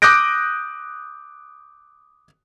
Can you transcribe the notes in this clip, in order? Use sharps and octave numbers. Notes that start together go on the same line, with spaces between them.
D6 D#6 F#6 G6 A#6 D7